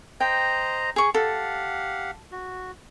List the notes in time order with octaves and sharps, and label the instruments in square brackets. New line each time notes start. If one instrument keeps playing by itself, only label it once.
[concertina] C5 D#5 A#5 [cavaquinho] G5
[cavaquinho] G#4 C#6
[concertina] G4 F5 F#5 [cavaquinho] A4
[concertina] F#4